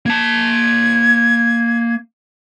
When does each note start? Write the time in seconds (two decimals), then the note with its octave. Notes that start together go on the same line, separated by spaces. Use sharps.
0.06 A#3 A5 G#6